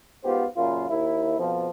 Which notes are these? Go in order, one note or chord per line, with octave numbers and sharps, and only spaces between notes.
G#2 B3 F4 G4 C5
F#2 A#2 C#3 F4
D#2 E4
F2 B2 F3